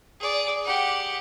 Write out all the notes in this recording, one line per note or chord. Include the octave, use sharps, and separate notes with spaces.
G#4 D5
G4 F#5